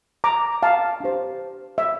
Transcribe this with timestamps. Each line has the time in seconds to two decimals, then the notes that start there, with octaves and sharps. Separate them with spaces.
0.24 A#5 D6
0.63 F5 A5
1.00 D4 G4 C5
1.78 E5